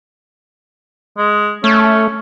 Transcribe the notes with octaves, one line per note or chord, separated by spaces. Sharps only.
G#3
A3 C#4